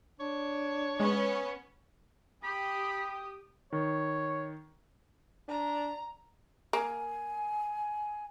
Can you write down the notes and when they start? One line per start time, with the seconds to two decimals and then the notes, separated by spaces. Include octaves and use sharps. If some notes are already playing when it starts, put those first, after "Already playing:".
0.20 D4 C#5
1.00 G#3 B3 C#4
2.43 G4 G5 B5 D#6
3.72 D#3 C#5
5.48 D4 A#5
6.73 A#3 G#5